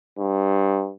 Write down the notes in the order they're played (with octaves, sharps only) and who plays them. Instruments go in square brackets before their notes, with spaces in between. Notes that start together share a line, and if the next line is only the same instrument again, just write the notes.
[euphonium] G2